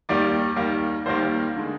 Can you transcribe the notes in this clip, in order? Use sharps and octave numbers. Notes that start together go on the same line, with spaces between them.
D#2 D#3 G3 A#3 D5
D#2 D#3 G3 A#3
D#2 D#3 G3 A#3 C5
D3 G#3